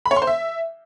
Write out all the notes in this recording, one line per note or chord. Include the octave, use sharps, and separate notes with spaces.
B5
C#5
C6
C5
E5